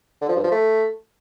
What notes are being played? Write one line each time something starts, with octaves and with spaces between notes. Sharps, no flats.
D3
F3
G2
F3
A3